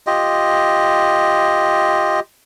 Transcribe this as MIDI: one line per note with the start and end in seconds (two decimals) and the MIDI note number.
0.07 2.20 65
0.07 2.20 67
0.07 2.20 75